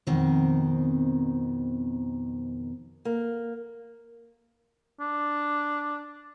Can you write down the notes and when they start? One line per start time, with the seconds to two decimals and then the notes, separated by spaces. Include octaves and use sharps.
0.07 F2 B2 D#3 C4
3.05 A#3
5.00 D4